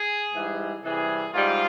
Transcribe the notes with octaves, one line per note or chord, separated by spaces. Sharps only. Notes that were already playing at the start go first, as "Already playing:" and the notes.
Already playing: G#4
G#2 E3 G3
C3 E3 G3 G#4
G#2 G3 F4